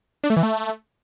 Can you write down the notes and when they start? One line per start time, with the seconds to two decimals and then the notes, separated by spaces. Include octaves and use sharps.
0.24 D4
0.30 A3
0.37 E3
0.43 A3